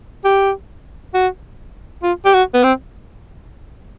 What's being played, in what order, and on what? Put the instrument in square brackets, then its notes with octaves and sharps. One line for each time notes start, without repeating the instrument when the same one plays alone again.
[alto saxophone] G4
F#4
F4
G4
F#4
B3
C4